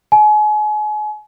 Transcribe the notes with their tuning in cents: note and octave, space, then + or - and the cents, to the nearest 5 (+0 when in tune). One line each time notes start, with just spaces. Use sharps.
G#5 +35